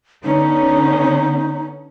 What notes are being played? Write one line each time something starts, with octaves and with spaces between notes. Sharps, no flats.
D3 B3 C#4 D#4